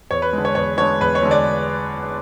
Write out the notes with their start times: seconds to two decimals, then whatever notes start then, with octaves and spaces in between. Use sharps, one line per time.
0.11 E2 C#5
0.22 B4
0.33 D3 G#3
0.45 C#5
0.55 E2 C#5
0.78 D3 G#3 C#5
1.00 E2 B4
1.15 C#5
1.23 D3 G#3
1.31 D5